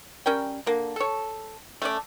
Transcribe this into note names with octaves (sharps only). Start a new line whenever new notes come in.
G3 C#4 A#4 G5
D3 A#3
A4 C#5
A3 C#4 D5